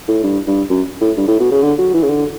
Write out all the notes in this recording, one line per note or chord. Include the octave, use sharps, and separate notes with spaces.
A2
G2
G2
F#2
A2
G2
A2
B2
C#3
D3
F#3
E3
C#3
D3